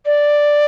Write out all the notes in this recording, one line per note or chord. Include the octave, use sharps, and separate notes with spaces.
D5